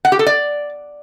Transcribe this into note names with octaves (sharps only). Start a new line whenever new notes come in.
F#5
G4
A4
D5